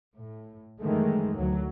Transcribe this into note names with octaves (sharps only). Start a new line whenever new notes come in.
A2
F#2 D#3 E3 G#3 A3
D2 F#3